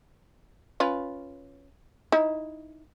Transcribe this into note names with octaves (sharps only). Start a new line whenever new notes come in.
C#4 F4 B4
D#4 E4